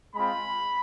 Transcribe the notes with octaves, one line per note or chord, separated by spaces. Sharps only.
G#3 C4 F4 B5